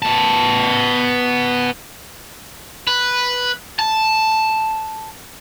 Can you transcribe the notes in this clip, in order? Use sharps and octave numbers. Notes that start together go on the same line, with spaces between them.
B3 A5
B4
A5